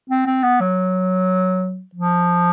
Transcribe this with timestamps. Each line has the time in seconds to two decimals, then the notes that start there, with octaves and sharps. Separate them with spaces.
0.10 C4
0.26 C4
0.44 B3
0.61 F#3
1.95 F3